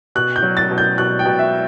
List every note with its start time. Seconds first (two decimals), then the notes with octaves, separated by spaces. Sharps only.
0.15 B2 F#6
0.36 G6
0.42 F#3
0.57 A6
0.71 B2
0.78 G6
0.98 B2 F#6
1.19 G5
1.25 B2
1.39 E5